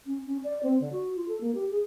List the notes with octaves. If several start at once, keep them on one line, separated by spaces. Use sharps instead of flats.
C#4
C#4
D5
C4
D3
F#4
F4
A4
A#3
G4
G#4